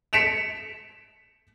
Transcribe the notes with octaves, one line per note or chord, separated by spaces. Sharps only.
B6 C#7 D7 E7 F7